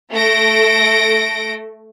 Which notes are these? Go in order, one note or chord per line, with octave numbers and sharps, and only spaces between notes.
A3 A4 A#6 D7